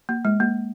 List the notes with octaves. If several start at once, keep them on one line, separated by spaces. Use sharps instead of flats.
A#3
G#3
A#3